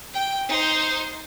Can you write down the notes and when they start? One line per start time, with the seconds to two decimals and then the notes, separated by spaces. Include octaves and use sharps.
0.13 G5
0.48 D#4 C5